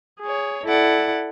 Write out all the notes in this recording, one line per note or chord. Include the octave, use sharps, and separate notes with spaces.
G#4 C#5
E4 A4 D5 F#5